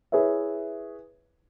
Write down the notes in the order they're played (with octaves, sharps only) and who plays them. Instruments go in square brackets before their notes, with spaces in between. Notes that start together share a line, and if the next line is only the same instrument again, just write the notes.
[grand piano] E4 G#4 B4 C#5 E5